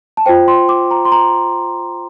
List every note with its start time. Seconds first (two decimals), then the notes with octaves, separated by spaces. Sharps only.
0.17 A5
0.26 F4 C5 G5
0.48 C6
0.69 D6
0.91 A#5
1.05 C6
1.12 A#5